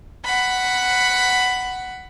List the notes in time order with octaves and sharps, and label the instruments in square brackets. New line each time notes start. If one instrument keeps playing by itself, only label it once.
[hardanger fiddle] F#5 B5